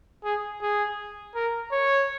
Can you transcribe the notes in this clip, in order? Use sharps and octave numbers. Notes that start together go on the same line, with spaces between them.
G#4
G#4
A#4
C#5